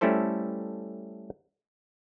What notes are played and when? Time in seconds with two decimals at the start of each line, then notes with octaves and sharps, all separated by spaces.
0.01 G3 A3 C#4 E4 A4 C5